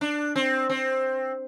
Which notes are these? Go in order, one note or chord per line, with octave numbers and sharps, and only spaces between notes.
D4
C4
C4